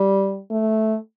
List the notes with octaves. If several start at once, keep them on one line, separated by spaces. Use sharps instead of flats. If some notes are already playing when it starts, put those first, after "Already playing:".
Already playing: G3
A3